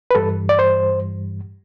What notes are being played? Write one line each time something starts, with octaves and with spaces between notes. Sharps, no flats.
B4
G2 E3 G3 A4
D5
C5